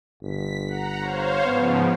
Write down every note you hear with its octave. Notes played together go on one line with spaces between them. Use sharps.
G1 B6
F#5 A#5
C5 C#5 F5
G#2 C#3 F3 B3